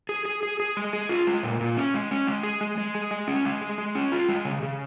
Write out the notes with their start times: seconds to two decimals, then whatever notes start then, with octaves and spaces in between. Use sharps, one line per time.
0.09 G#4
0.25 G#4
0.43 G#4
0.60 G#4
0.77 G#3
0.93 G#4
1.09 F4
1.27 G#3
1.43 A#2
1.61 A#2
1.77 C#4
1.94 G#3
2.11 C#4
2.27 G#3
2.43 G#4
2.61 G#3
2.78 G#3
2.95 G#4
3.11 G#3
3.28 C#4
3.45 G#3
3.61 G#4
3.78 G#3
3.95 C#4
4.12 F4
4.28 G#3
4.45 C#3
4.62 C#3